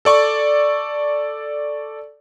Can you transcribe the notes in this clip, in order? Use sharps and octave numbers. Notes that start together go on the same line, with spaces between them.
A4 D5 C#6